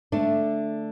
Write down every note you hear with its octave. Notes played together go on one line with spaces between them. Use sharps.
D3 A3 D4